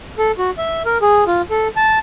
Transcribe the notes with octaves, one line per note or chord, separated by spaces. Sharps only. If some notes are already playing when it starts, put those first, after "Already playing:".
A4
F#4
E5
A#4
G#4
F4
A4
A5